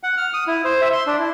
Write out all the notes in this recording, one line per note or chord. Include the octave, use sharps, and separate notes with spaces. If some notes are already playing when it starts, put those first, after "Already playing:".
F#5
F6
D#6
E4
C5
E5
C6
D4
E4